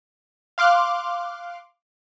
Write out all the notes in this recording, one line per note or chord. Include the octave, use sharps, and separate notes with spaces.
F5 C6 D6 F6 F#6